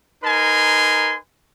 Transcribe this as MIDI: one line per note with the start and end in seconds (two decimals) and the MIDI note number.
0.23 1.17 63
0.23 1.17 70
0.23 1.17 71
0.23 1.17 80
0.23 1.17 84